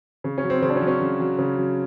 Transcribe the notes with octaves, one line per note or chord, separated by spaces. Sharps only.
C#3
C#4
F#3
C4
C#3 C4
D4
C#4
F#3
C#4
C#3
F#3
C#3
F#3